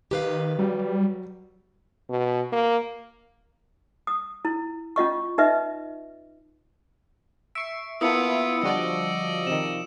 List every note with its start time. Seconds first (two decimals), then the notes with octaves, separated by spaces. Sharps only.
0.11 D#3 G4 B4 F5
0.59 F#3 G3
2.09 B2
2.53 A#3
4.07 D#6
4.45 E4
4.96 C#4 F4 D#5 C#6
5.38 D#4 B4 D#5 E5
7.55 E5 C#6 C7 D7
8.01 A#3 B3 E4 F4 A4 D#6 E6 C#7
8.63 D3 F3 G3 F#4 D5 D#5
9.47 C3 D#3 E7